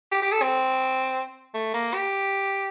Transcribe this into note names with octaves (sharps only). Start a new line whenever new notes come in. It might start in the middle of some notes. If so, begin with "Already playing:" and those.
G4
G4
A4
C4
A3
A#3
G4